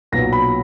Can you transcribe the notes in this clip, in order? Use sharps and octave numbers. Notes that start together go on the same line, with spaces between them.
B1 A#2 F#3 B3 A#6
B5